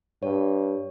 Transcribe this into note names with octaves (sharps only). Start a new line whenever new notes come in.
G2 C#5